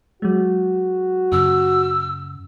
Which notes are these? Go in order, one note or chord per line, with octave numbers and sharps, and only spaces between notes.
F#3 G#3 F#4
F#2 C#3 E6